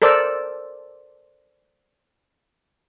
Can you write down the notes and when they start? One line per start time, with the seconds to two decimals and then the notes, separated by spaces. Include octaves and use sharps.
0.02 A4 A#4 C5 D5 E6